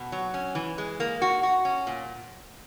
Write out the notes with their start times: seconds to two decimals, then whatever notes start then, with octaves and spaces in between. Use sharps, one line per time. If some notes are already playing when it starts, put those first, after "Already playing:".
Already playing: B2
0.12 F#3
0.34 C#4
0.55 E3
0.78 G#3
1.00 A#3
1.22 F#4
1.43 F#4
1.65 C#4
1.87 A#2